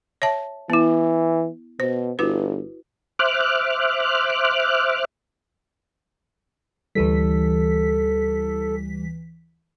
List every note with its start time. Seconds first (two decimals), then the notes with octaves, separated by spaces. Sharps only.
0.22 C#5 E5 A5
0.70 E3 B3 E4
1.80 B2 C5
2.19 G1 E4 F#4 B4
3.19 C5 E5 D6 F6 F#6
6.95 D2 E3 G3 A4 B6